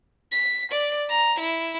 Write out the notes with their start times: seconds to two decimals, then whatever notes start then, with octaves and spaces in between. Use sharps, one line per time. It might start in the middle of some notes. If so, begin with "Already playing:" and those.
0.32 B6
0.72 D5
1.09 A#5
1.39 E4